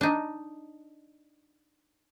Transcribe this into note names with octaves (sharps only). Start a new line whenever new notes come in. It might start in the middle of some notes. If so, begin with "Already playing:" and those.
D4 D#4